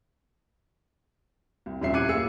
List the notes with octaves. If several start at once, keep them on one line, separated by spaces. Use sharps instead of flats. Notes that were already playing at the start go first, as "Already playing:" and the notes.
C2
D#1 C2 C#4 E5 C7
D6 F#6 G#6 C7 C#7 D#7
A2 A#3 G#4 E6 C#7